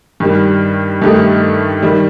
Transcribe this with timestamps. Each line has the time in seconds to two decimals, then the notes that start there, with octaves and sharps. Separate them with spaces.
0.20 G2 D#3 G3
1.02 G2 D#3 A3 D#4 G4
1.83 D#3 G3